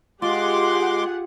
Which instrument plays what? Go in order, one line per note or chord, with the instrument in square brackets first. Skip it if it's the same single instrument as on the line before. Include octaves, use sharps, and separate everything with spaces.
[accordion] G#3 C6 D6 [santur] F4 [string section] G4 G#4 F#5